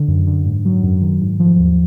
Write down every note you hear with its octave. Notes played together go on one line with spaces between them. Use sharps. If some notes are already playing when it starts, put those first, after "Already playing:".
Already playing: D3
F#2
D3
G#2
F#3
F#2
D#3
G#2
F3
D#2